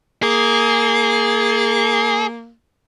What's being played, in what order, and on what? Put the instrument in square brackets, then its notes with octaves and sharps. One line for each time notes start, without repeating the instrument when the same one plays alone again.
[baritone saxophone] A#3 [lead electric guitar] G#4